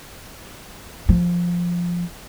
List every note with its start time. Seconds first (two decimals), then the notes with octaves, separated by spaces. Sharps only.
1.09 F3